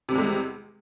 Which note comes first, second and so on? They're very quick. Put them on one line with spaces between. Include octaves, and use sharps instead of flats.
C3 G3 E2 G#3